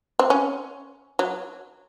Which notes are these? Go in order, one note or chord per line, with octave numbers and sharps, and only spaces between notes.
C4
C#4
F#3